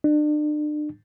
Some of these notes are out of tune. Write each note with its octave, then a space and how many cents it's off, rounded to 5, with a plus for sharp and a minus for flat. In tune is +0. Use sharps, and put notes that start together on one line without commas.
D4 +40